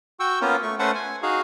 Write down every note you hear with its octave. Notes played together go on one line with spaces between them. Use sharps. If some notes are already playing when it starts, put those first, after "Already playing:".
F#4 G5 C#6 E6
A#3 B3 C#4 F4 A#4
A3 C#6
A3 C#4 B4 C5 F#5 A5
G#5
D#4 F#4 G#4 F5